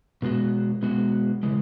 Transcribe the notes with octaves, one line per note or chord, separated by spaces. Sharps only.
B2 G#3 B3 F#4
B2 G#3 B3 F#4
C#3 E3 G#3